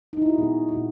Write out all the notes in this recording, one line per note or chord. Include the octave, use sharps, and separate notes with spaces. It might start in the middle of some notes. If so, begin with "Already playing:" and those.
D#4
E4
F#4
A#2 G#3 B3 G#4
A#2 G#3 B3 F#4